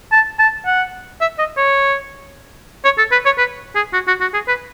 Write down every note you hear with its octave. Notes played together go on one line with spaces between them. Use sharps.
A5
A5
F#5
E5
D#5
C#5
C#5
A4
B4
C#5
B4
G#4
F#4
F#4
F#4
G#4
B4